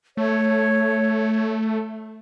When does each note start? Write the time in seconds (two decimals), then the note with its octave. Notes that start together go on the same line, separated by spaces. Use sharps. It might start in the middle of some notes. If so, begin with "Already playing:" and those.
0.17 A3 C#5